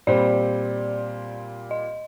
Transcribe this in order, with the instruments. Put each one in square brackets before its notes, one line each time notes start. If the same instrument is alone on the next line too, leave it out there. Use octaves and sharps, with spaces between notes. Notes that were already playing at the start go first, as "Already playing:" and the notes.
[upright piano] A#2 G3 C4 G4 C5 [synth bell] D5
[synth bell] D#5